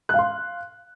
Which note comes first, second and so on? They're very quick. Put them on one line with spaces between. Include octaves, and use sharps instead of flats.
F#6 F5 C6